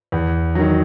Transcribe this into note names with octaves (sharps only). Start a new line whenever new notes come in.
E2
D#3 F#3